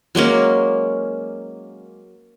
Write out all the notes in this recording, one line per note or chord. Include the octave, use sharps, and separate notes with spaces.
F#3 G#3 A#3 C#4